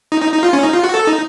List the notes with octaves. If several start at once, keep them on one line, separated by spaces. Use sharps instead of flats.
D#4
D#4
D#4
F4
C#4
D#4
F4
F#4
A4
D#4